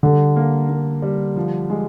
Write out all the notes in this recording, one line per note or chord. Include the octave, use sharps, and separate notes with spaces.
D3 G3
A#3
A#3
G3
F3
G#3